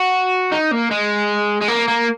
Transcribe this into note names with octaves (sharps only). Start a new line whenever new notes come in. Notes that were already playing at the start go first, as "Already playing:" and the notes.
Already playing: F#4
D#4
A#3
G#3
G#3
A#3
A#3